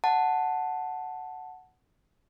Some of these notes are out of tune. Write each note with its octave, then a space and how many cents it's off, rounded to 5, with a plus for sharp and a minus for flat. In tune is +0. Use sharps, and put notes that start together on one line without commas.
F#5 +0 A5 +0